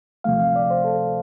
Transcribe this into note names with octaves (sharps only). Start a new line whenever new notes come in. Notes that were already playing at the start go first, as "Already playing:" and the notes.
D2 C3 F3 A3 F5
F5
D5
C5
A4